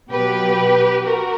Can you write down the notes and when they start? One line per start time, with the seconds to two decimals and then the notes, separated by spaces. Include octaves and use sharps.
0.10 B2 F#3 G4 B4
1.06 F#4 A#4